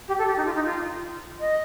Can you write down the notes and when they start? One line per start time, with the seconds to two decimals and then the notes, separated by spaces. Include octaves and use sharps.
0.08 G4
0.18 A4
0.28 G4
0.37 D#4
0.46 F4
0.55 D#4
0.65 F4
1.40 D#5